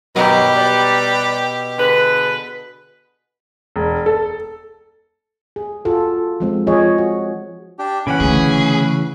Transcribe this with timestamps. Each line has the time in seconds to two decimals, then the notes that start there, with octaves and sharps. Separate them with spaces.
0.16 G2 B2 D#3 F#3 G4 A#5 B5
0.56 G3 B4 D5
1.79 D3 G#4 B4
3.76 E1
4.06 A4
5.56 G#4
5.85 F4 F#4 A4
6.40 F3 G#3 C4
6.67 F3 G#4 C#5 D#5
6.98 F#4
7.79 D4 G4
8.07 C#3 E3 C#4 F#5 B5
8.20 D3 A3 G#4